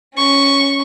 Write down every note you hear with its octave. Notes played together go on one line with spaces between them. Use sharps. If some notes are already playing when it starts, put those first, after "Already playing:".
C#4 C#6